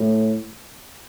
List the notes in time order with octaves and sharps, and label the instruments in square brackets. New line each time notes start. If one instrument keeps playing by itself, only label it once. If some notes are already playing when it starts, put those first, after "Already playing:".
Already playing: [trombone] A2